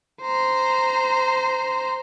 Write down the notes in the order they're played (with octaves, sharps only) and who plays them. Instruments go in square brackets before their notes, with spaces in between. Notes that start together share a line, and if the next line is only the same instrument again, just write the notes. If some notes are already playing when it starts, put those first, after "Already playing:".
[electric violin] C5 A#5